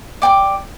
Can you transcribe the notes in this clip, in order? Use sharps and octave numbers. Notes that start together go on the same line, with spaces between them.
D5 G5 D6